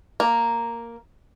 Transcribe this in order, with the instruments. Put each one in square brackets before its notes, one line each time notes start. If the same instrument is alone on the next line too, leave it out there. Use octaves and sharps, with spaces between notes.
[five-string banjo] A#3